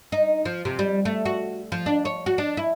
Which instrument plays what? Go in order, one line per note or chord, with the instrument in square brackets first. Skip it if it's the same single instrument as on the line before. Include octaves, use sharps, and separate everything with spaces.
[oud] D#4
F3
C3
G3
A3
F#4
F3
D4
C#5
F#4
D4
E4